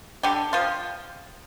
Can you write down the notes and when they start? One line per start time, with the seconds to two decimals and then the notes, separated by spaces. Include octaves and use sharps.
0.23 D3 G3 G4
0.53 F3 F4